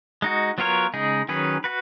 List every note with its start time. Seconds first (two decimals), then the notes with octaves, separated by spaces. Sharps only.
0.22 G#3 D#4 F#4
0.58 F#3 B3 F4 A#4 C#5
0.94 C#3 G#3 D#4 G#4
1.28 D#3 F#3 C#4 G#4 B4
1.64 F#4 B4